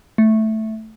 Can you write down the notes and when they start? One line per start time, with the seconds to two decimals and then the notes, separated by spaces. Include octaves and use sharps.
0.18 A3